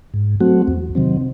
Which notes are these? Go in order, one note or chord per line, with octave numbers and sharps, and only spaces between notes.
G#2
F#3 A3 C4 F#4
E2
C3 D#3 F#3 C4